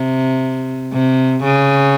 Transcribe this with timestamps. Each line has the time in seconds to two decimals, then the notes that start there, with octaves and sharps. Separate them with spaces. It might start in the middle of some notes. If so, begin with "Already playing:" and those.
Already playing: C3
0.93 C3
1.44 C#3